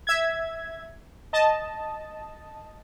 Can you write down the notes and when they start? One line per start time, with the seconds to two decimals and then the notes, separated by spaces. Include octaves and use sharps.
0.07 E5 G#6
1.33 D#5 A5